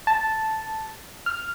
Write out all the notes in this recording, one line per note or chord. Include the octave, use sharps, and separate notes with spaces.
A5
F6